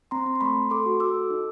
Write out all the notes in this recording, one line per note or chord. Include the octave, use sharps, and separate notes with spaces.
C4 A#5 C6
C4
C6
A3 B5 C#6
A3
A4 C6 D6
F#4
F#4 D6 E6
A4
D#4